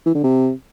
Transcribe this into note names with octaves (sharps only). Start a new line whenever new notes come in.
E3
D3
C3